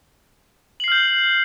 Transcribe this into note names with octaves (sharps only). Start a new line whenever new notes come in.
F6 G6 C7 F#7